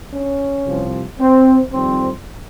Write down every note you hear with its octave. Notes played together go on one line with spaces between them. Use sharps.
C#4
C2 C3 F3 C4
C4
F2 D#3 G3 C4